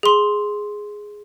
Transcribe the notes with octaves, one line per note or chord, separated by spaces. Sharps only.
G#4 C6